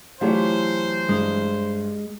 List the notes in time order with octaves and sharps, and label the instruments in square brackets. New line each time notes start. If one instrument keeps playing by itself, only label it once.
[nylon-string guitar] E3 F#3 A3 [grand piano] F4 G4 C#5 [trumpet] C5
[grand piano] G2 [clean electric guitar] G#3